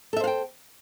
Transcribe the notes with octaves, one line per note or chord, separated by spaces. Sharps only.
A4 C5 E5 F5 G5